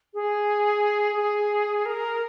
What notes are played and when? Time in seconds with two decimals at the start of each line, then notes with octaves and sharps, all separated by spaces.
0.14 G#4
1.16 G#4
1.86 A#4